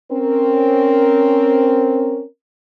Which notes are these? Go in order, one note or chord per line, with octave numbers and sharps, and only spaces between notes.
C4 C#4 A#4